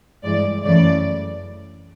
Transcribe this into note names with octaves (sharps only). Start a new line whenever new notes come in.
G2 E3 G#3 D5
F#2 C#3 E3 A3 D5